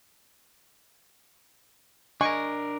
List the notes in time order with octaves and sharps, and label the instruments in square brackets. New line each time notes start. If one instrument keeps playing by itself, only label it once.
[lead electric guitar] D4 A#4 [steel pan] D#5 G#5 C#6